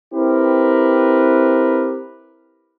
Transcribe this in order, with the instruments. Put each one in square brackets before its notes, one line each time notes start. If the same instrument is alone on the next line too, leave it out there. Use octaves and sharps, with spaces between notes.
[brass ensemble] C4 E4 G4 A#4 B4